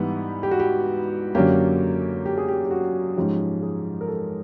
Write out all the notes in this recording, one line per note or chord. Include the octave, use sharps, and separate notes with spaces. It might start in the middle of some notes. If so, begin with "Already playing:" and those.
Already playing: G#2 E3 G3 B3
G4
F#4
G4
F#2 D3 F#3 A#3 C#4 G4
G4
G#4
G4
G4
F#4
G#2 F3 G#3 C#4 G4
G#4
A#4
A4